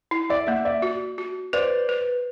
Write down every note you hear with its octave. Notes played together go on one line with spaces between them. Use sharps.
E4
D5 E5
A#3 E5 F#5
D5 E5
F#4
F#4
B4 C5 D5
B4